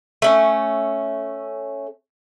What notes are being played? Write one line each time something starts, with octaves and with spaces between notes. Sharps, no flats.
A3 C#4